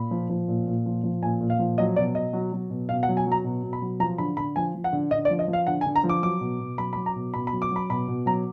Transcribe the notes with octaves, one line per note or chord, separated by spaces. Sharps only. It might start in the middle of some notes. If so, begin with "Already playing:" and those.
Already playing: A#2 B5
F3
F3
A#2
A#2
F3
F3
A#2 G#5
A#2
F5
F3
F#3 D#5
B2 D5
B2 D#5
F#3
F#3
B2
B2 F5
F#5
F#3
G#5
F#3 A#5
B2
B2
B5
F#3
F3 A#5
D3 B5
D3 B5
F3 G#5
F3
F#5
D3
D3 D#5
D5
F3
D#5
F3
F5
D3 F#5
G#5
D3
A#5
F3
D6
F#3 D6
B2
B2
F#3 B5
B5
F#3
A#5
B2
B2 B5
B5
F#3
D6
F#3 B5
B2 B5
B2
F#3 A#5